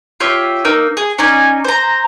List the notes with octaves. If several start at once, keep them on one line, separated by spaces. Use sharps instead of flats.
F4 G4 C#5 E5
A#3 D#4 E6
G#4
C#4 D#4 D5 G#5
C5 A#5